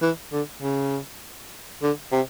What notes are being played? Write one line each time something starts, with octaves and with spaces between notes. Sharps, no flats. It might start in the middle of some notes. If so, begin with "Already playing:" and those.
E3
D3
C#3
D3
C3